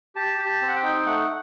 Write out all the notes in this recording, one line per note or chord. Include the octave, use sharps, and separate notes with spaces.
G4 A5
G4
A5
C4
F#5
G5
D#4
A3 F#5